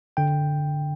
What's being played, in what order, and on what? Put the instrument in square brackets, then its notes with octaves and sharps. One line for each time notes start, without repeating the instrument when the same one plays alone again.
[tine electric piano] D3 G5